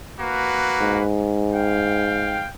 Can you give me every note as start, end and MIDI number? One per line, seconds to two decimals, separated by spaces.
0.20 1.04 58
0.20 1.04 66
0.20 1.04 71
0.81 2.45 44
1.53 2.48 77
1.53 2.48 79